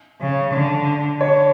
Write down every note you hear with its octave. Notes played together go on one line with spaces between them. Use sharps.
C#3
D3
D3 C#5